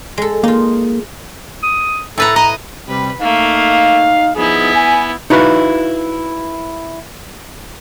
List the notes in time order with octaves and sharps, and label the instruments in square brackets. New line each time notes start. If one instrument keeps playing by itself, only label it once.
[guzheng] G#3 A4
[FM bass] A#3 [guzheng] D#4 F4
[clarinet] D#6
[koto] A2 B4 A#5 [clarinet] A4
[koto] D#5 [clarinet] A#5
[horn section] C3 G3 [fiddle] B4
[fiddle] A3 A#3 [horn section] D#4 F5
[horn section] F3 D#4 G#4 [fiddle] B3 E4
[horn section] G#5
[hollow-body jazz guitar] D#4 E4 F#4 B4 E5 F5